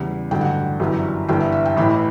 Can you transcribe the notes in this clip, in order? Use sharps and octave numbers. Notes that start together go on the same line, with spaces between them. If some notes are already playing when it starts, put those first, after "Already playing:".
Already playing: E2 C#3 G3
A1 G2 D3 F#3 G5
F#5
G5
G1 F#2 E3 G3
G1 G2 E3 G3 G5
E5
E5
G5
A1 A2 E3 B5